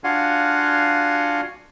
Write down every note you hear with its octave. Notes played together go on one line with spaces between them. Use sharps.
D4 F4 F#4 F5 F#5 G#5